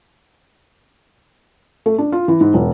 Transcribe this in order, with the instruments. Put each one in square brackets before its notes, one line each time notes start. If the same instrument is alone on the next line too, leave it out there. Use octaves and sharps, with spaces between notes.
[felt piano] A3
D4
F4
E3
G#2
E1